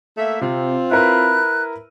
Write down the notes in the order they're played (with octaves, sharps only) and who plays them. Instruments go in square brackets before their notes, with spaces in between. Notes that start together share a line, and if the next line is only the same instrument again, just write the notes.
[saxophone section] A3 A#3 E5
[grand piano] C3 [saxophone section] C4 F4
[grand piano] E4 A#4 B4 [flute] F#6